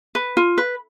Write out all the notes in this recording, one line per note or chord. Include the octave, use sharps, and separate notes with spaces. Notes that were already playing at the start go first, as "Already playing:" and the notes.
B4
F4
B4